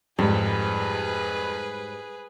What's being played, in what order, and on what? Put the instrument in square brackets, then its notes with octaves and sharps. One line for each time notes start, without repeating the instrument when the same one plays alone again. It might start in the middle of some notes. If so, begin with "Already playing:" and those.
[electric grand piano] F2 [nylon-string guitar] G#2 [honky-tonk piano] G3 [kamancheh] G#4 B4